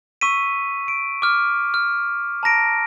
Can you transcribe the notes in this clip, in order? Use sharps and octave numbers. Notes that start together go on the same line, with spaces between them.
C#6 E6 B6 D#7
D7
D6 F6
F6
A5 A#5 A#6 D7